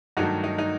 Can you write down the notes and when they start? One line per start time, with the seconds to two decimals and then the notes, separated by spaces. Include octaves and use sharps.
0.17 G2 D#3 F#3 A3 D#4 F#4
0.44 D#4
0.58 D#4